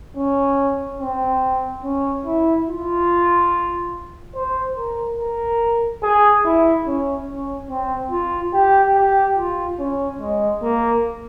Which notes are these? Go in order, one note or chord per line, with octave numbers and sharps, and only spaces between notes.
C#4
C4
C#4
E4
F4
C5
A#4
A#4
G#4
E4
C#4
C#4
C4
F4
G4
G4
F4
C#4
G#3
A#3